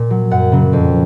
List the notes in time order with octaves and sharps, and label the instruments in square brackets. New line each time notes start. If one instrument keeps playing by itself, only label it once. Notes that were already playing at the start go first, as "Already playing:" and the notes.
Already playing: [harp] A#2
F#3
F#2 F#5
C#3 F#3
F2